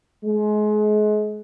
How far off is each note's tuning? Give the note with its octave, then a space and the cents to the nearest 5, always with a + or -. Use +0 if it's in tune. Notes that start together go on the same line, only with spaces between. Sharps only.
G#3 +30